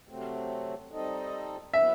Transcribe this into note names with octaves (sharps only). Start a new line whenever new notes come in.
C3 F#3 A3 C4
G3 C4 D#4 A4 D#5
F#3 B3 E4 B4 E5